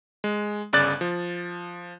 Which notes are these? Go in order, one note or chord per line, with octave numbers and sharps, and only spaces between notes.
G#3
G1 C#3 D5 F#6 A6
F3